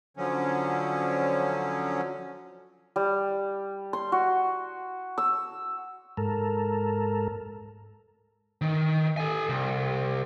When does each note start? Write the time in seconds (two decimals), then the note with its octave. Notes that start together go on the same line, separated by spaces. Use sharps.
0.17 D3 F3 F#3 C#4
2.96 G3
3.93 C6
4.12 F#4
5.18 E6
6.17 G#2 A4 A#4
8.61 D#3
9.17 A4 G#5
9.49 C2